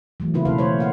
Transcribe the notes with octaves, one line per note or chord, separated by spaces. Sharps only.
E3 F#3 A3
C#3 A#3 C4 E4 F4 B4
B2 A3 C#4 A4 B4 F5
E3 A3 C5 C#5
A#3 F5 F#5